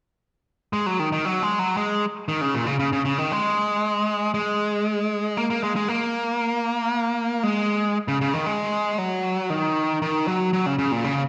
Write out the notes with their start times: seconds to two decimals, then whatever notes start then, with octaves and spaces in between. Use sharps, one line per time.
0.73 G#3
0.86 F#3
1.00 D#3
1.12 D#3
1.25 F#3
1.42 G#3
1.59 F#3
1.77 G#3
2.28 D#3
2.41 C#3
2.54 A#2
2.67 C#3
2.79 C#3
2.93 C#3
3.05 C#3
3.18 D#3
3.32 G#3
4.34 G#3
5.37 A#3
5.50 A#3
5.63 G#3
5.76 G#3
5.88 A#3
7.43 G#3
8.08 C#3
8.21 C#3
8.34 D#3
8.46 G#3
8.98 F#3
9.50 D#3
10.02 D#3
10.28 F#3
10.53 F#3
10.66 C#3
10.79 C#3
10.92 A#2
11.04 C#3